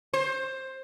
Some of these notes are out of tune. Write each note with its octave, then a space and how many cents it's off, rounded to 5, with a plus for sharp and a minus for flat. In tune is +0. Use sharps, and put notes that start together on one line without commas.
C5 +15